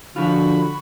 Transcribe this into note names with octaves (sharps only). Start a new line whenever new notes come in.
D3 F3 F4 F#4 B5